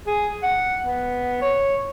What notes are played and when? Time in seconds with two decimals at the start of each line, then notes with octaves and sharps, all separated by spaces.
0.06 G#4
0.43 F#5
0.85 B3
1.42 C#5